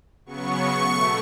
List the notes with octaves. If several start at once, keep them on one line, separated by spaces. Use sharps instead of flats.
C#3 F#3 B3 C#6
B2 A3